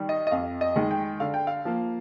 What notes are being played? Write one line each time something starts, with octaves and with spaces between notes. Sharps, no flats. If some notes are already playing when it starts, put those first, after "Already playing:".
Already playing: D#3 G3
D#5
D#5
F2 F5
D#5
D#3 G#3
G5
D3 F5
G5
F5
F3 A#3